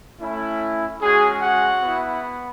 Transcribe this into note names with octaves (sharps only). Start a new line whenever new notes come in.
A3 C#4 E4
G#3 C#4 F#4 G#4
F#4 F#5
B3 E4